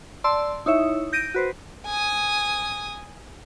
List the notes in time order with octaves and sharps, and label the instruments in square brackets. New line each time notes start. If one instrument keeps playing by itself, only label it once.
[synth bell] D5 A5 C6 E6
D#4 E4 C#5 E5
G6 A#6 D7 D#7
F#4 B4 C5
[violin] G#5 D#6